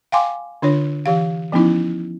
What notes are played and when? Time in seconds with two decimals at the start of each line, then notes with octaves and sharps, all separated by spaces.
0.12 F5 G5 G#5 C6 D6
0.62 D3 D4 F4 C#5
1.06 E3 G4 F5
1.52 F3 B3 C#4 D#4 E4